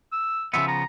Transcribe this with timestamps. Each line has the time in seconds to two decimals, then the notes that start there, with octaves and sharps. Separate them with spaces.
0.12 E6
0.54 C#3 F3 B3 E5
0.68 A#5